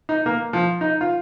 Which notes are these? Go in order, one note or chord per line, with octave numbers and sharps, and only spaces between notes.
D#4
A#3
F3
D#4
F4